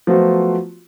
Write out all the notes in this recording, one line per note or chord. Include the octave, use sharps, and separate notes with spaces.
F3 F#3 A3 B3 F4 F#4